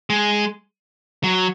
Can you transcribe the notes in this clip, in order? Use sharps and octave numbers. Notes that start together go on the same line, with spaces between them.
G#3
F#3